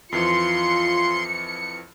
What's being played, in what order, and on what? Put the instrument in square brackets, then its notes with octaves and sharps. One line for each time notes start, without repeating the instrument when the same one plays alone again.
[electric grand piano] F2 E3 F3 [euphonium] F4 [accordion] C6 [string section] C#7